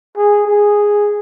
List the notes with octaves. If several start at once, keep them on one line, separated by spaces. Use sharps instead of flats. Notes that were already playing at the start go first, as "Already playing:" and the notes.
G#4
G#4